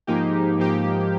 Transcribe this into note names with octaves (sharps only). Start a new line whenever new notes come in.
G#2 F3 A#3 D#4 G4
G#2 F3 A#3 D#4 G4